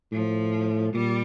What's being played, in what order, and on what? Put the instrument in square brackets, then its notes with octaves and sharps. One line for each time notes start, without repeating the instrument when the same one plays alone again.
[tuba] A2 [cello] F3
[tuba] A#2 [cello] G3